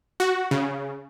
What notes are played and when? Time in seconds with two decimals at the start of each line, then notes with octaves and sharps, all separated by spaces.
0.20 F#4
0.51 C#3